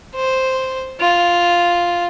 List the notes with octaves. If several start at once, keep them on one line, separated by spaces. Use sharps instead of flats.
C5
F4